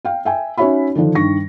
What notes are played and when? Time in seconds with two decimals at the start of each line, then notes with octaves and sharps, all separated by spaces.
0.05 F5 G5
0.25 E5 G5 G#5
0.58 C#4 D#4 F#4 C#5 E5 B5
0.95 D3 D#3 F3 D4
1.15 G2 D#3 C#6 A#6